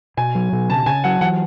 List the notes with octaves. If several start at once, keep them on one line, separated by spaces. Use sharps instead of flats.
B2 G#5
F#3
B2
C#3 A5
C#3 G#5
F#3 F#5
E3 F#5